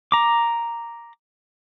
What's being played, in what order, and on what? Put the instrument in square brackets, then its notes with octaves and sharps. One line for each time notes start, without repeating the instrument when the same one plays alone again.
[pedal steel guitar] A#5 D6